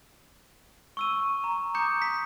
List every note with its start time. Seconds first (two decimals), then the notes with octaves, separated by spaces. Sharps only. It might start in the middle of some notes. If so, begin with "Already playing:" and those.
0.97 C#6 E6 D#7
1.44 A#5
1.74 A#5 D6 D#6 G6 C#7
2.02 B6